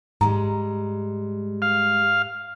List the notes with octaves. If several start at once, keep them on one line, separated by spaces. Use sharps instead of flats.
G#2 G3 G#3 A#5
F5